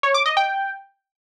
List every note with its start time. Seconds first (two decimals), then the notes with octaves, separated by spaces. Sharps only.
0.03 C#5
0.14 D6
0.26 D#5
0.37 G5